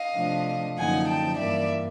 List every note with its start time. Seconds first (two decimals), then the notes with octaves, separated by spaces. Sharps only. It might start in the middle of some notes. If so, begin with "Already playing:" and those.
Already playing: D#5 F5
0.15 C3 F3 A3 D4
0.77 F#2 D3 F3 A#3 D#4 F#5 G#5
1.07 G5 A5
1.38 G2 E3 G3 A#3 D5 E5